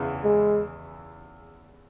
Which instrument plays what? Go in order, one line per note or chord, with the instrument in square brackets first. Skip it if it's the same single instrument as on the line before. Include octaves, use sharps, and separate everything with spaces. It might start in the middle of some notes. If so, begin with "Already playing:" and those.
Already playing: [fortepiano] E2 C#3 E3
[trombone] G#3